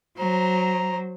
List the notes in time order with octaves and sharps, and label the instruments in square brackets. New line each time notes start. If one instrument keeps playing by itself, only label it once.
[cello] F#3 [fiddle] C5 [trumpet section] A#5